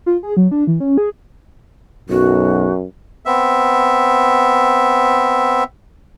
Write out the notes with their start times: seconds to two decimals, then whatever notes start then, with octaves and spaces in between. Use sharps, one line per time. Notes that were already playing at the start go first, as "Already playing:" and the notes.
0.06 F4
0.23 G#4
0.37 F#3
0.51 D4
0.67 E3
0.80 C#4
0.98 G#4
2.09 B1 F#2 F#4
3.25 B3 C4 E5